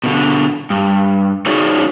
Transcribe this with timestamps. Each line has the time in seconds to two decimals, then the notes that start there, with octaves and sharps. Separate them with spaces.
0.04 B2 D3
0.70 G2
1.46 C#4 D#4 F#4 G#4 C#5 D5